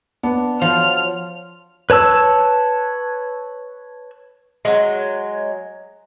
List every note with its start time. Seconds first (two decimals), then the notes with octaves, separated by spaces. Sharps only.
0.23 B3 D4
0.62 F3 F#3 C6 F6
1.90 B4 C#5 A5 E6
4.65 F#3 G#3